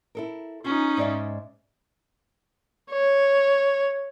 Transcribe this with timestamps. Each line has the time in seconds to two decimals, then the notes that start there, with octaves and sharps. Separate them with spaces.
0.15 E4 A4 A#4
0.65 C#4 D#4 F4 G#5
0.97 G#2 D5 E5
2.92 C#5